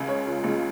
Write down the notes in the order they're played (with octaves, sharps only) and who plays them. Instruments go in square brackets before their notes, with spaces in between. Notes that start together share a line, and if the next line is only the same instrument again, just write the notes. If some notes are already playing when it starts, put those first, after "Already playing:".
Already playing: [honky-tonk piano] C#2 C#3 G#3
[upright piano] C#5
F4
[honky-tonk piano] C#2 C#3 G#3 [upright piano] F4